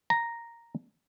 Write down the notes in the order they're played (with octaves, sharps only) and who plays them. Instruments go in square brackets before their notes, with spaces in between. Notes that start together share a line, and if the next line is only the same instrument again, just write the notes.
[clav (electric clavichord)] A#5